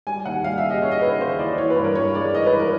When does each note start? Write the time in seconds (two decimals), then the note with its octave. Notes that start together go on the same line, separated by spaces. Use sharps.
0.07 G3 G#5
0.26 D#2 F#5
0.44 G3 F5
0.58 E5
0.64 C#3
0.70 D#5
0.82 C#3 C#5
0.91 D#5
1.01 C#3 B4
1.20 D#2 C5
1.39 E3 D5
1.58 E3 C#5
1.70 B4
1.76 G2
1.84 A#4
1.95 G2 C#5
2.15 G#3 D5
2.34 E3 D#5
2.46 B4
2.53 E3
2.60 A#4